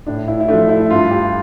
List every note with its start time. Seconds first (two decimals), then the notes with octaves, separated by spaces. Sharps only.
0.06 A2 D4
0.28 E4
0.40 E4
0.48 F3 A3 D4
0.69 E4
0.90 G2 F4
1.11 G4